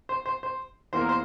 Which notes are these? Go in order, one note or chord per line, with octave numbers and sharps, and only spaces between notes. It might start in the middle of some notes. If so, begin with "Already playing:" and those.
C5
C5
C5
E2 E3 A#3 C5
A#4
C5